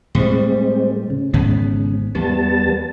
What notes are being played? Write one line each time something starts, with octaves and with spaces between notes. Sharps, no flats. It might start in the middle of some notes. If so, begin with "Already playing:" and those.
A2 G3 G#3 C4
C#3
G#1 G#2 B3
E2 G3 B3 A5